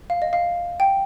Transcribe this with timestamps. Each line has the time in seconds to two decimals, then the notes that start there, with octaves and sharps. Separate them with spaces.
0.10 F5
0.22 D#5
0.33 F5
0.80 G5